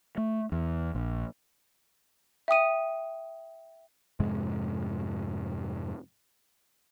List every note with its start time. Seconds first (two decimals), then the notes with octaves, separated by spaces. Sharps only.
0.17 A3
0.52 E2
0.95 A#1
2.48 E5 G5 D#6 D#7
4.20 F2 G#2 C3 G#3